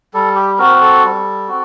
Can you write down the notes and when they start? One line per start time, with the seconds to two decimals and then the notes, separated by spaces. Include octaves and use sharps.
0.14 G3 A4
0.36 G4
0.58 C4 F#4 A#4
0.81 A4
1.04 G3
1.48 C4 F#4